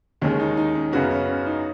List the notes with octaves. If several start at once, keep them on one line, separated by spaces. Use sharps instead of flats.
D#2 D#3 G#3 C#4
D#4
D#4
C#4
F#2 C#3 B3 C#4 F#4
C#4
C#4
D#4